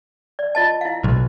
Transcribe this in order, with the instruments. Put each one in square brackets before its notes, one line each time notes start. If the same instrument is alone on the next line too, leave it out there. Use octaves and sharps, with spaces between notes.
[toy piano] D5
F4 D#5 A5
E4 F5
[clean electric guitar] B1